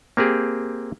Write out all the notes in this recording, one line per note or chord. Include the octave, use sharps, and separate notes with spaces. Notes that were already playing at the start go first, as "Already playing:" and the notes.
A#3 C4 G4 G#4